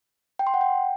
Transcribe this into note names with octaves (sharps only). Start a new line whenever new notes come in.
G5
C6
F#5
G5